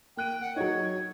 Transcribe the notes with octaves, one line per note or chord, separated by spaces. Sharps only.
A#3 G5 F#6 D#7
F#5
F#3 D#4 C#5